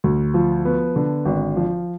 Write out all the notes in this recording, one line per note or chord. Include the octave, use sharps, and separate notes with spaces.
D2
F3
B3
D3
G#1
F3